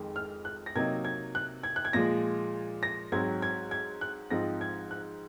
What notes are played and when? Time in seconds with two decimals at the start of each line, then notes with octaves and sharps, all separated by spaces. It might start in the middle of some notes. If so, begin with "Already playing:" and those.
Already playing: F2 D#3 G#3
0.16 F6
0.45 F#6
0.66 A#6
0.76 C3 F#3 A#3 D#4 G#6
1.05 G#6
1.35 F#6
1.63 G#6
1.76 F#6
1.85 G#6
1.93 A#2 F3 G#3 A#6
2.83 A#6
3.12 G#2 F#3 C4 G#6
3.42 G#6
3.71 G#6
4.01 F#6
4.30 G#2 F3 C4 D#4 A#6
4.61 G#6
4.91 F#6